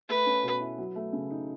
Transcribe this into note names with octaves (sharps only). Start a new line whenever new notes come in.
A3 B4
C#4
B2
E4
F#3
A3
C#3
D#4